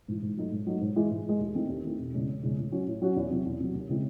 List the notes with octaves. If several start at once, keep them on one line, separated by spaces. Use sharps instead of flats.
G#2 E3
G#2
F#3 A3 D#4
G#2
F#3 A3 D#4
G#2
E3 G#3
G#2
E3 G#3
D#2
D#3 A3 C4 E4
D#2
D#3 A3 C4 E4
E1
E2 C#3 G#3 C#4
E1
E2 C#3 G#3 C#4
A2
F#3 C#4 F#4
A2
F#3 C#4 F#4
E2
C3 F#3
E2
C3 F#3
D#2
C#3 G#3 C4 E4